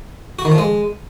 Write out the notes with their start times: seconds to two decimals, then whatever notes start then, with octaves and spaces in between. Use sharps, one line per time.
0.39 F#4
0.45 D#3
0.52 F3
0.58 G#3